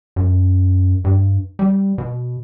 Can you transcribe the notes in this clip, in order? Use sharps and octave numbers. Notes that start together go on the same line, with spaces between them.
F#2
G2
G3
B2